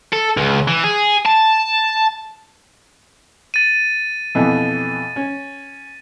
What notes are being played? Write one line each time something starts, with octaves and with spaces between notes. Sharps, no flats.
A4
C#2
E3
G#4
A5
A6 D#7
F2 B2 E3
C#4